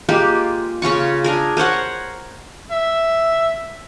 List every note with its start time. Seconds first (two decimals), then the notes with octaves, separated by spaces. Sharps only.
0.09 G#3 A#3 F4 G4
0.82 C#3 C#4 F4 C#6
1.24 D4 G#4 A#4
1.57 A#4 C5 C#5 F#5
2.71 E5